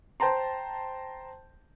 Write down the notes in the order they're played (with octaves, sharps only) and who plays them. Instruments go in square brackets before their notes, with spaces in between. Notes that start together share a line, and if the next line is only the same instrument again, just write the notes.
[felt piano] C5 G5 A5 A#5 C6